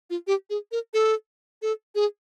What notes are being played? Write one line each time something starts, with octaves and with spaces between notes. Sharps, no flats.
F4
G4
G#4
A#4
A4
A4
G#4